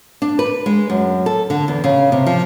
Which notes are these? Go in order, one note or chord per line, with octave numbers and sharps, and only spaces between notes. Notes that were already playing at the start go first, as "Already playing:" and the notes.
D4
B4
G#3
F#2
A4
D3
E2
C#3
C3
F3